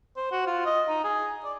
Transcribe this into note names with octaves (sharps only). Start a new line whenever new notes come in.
C5
F#4
F4
D#5
D#4
G#4
D5